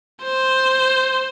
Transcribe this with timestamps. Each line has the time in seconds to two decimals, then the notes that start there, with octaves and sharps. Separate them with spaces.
0.23 C5